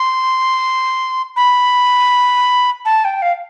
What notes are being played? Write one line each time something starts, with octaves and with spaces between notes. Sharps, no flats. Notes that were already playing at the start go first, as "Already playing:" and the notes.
Already playing: C6
B5
A5
G5
F5